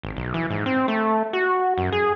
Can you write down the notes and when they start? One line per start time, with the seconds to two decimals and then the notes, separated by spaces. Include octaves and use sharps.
0.03 G#1
0.17 B1
0.34 E3
0.50 G#2
0.66 C4
0.88 A3
1.33 F#4
1.78 F#2
1.92 G#4